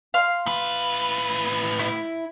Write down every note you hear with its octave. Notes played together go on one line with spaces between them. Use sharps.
F5 C6
A2 B4
E4